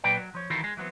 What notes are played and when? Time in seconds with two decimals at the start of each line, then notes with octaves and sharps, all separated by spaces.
0.04 A#2 F#3 A#3 B4 D5 G5
0.17 F#3
0.35 F3 C#5
0.50 D#3 E3 D#4 F4 F#4 A4
0.64 G#3
0.77 E3 F#3 B3 C4